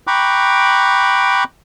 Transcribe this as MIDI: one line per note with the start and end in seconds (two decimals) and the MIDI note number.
0.07 1.44 79
0.07 1.44 82
0.07 1.44 83
0.07 1.44 85
0.07 1.44 86
0.07 1.44 90